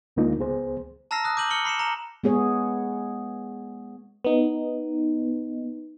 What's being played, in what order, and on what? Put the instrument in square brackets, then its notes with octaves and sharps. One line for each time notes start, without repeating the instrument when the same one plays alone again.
[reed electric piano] D2 D3 G#3 A#3 D#4 F4
C#2 B3 G#4 C5
[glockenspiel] A5 A#5 E6 F6 A#6 C7
D#6 F#6 A#6
D6 G6 D#7 F#7
F6 C#7 G7
B5 C7 C#7 E7
A#5 E7
[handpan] G#3 B3 G#4 C#5
[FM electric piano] B3 D#4